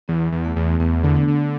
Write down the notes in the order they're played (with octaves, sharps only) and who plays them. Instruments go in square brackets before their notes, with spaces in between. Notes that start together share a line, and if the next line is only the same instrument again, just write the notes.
[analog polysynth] E2 [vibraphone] B3
[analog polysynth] E2
[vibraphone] A3
[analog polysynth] E2
[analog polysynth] E2 [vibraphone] B3
[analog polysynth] D3
[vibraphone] D4
[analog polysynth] D3